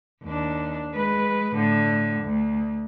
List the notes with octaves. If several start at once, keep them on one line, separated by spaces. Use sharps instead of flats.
D#2 D4
G#3 B4
A2 D3
D2